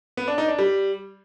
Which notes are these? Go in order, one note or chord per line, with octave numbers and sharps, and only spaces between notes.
B3
D4
D#4
D4
G3